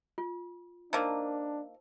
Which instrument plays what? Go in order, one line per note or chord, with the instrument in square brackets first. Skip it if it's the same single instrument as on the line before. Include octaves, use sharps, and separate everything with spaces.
[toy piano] F4
[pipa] D#3 A#3 [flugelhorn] D4 [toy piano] C5 A5 E6